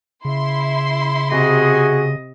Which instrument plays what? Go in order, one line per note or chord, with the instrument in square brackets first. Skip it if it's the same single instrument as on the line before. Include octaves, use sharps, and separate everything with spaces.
[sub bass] C#3 [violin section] E4 C6
[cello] C3 D#5 [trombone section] F#4 G#4